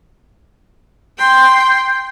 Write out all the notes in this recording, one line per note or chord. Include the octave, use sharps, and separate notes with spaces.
G5 C6